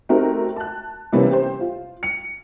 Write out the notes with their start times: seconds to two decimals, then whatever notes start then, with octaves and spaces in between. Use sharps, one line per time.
0.09 A3 C4 D#4 F#4 G4 A#4
0.56 A5 F#6
1.13 C3 E3 G3 A#3 B3 C#4
1.31 G4 C5
1.61 F4
2.03 C#7